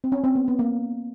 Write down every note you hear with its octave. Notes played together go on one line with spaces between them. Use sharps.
C4
C#4
C4
B3
B3
A#3